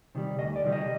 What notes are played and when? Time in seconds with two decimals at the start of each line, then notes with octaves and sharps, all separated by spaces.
0.15 C3 D#3 G3
0.39 D2 D#5
0.56 D5
0.64 C3 D#3 G3
0.72 D#5